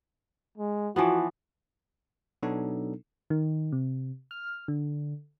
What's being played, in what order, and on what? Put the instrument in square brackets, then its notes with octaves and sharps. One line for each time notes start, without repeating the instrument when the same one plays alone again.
[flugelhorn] G#3
[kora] E3 F3 B3 [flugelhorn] F#4
[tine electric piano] B2 F#3 B3 D4 D#4 A4
[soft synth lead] D#3
C3
F6
D3